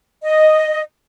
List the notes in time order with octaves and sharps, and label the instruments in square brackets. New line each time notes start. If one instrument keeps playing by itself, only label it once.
[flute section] D#5